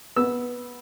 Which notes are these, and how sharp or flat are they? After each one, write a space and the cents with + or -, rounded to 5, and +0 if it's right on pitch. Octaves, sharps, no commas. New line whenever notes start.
B3 -15 E6 +0